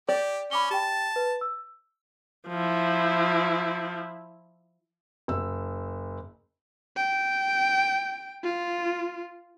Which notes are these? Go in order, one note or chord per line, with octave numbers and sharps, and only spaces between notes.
G4 D5
C#4 B5 D6 G7
G4 G5 A5
B4
E6
F3 E4
F#1 E6
G5
F4